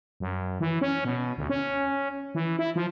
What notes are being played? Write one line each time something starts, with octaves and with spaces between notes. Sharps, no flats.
F#2
E3
C#4
B2
D2
C#4
E3
E4
F3